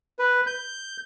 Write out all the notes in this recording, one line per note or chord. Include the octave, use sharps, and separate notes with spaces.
B4
G6